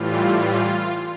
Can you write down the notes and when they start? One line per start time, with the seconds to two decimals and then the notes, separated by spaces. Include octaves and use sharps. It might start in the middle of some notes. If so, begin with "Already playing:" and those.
Already playing: A2 E3 G3 F4
0.39 F4